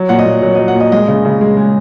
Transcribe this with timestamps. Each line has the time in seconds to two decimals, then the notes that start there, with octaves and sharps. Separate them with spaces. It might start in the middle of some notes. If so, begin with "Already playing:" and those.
Already playing: F#3
0.09 A#2 F#5
0.19 D#5
0.26 A#2
0.42 F#3
0.55 D#5
0.59 F#3
0.68 F#5
0.75 A#2
0.80 D#5
0.92 G#3 D#5
1.08 C#3
1.25 C#3
1.41 G#3
1.57 G#3